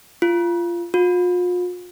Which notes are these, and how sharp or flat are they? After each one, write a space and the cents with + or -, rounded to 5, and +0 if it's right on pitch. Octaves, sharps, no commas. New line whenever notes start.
F4 -20
F4 +40